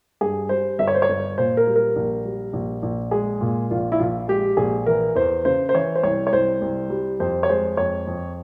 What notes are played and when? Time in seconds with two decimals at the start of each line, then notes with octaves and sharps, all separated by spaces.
0.21 G2 G#4
0.49 G3 C5
0.79 G1 E5
0.87 C#5
0.95 C5
1.02 C#5
1.09 G1
1.38 A#2 C5
1.57 A#4
1.67 G3
1.76 A#4
1.96 A#1
2.25 G3
2.53 A#1
2.82 A#1
3.11 G#3 G#4
3.41 A#2
3.71 A#1 F4
3.92 E4
3.99 A#1 F4
4.28 G#3 G4
4.57 A#1 G#4
4.86 E3 A#4
5.15 E2 C5
5.45 C#3 C5
5.69 C5
5.74 E3 C#5
5.96 C5
6.03 C2 C#5
6.27 C#5
6.33 C2 C5
6.62 C2
6.90 G3
7.20 F2 C5
7.43 C#5
7.49 G#3 C5
7.77 F2 C#5
8.07 F2